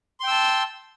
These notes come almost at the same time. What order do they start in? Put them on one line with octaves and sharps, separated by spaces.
C6 G5 E6 A5